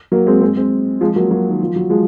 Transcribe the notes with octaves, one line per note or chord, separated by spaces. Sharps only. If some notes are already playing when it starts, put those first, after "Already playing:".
F#3 A#3
G#3 C4
G#3 C4
G#3 C4
F3 G#3
F#3 A#3
F#3 A#3
D#3
F3
F#3
F3 G#3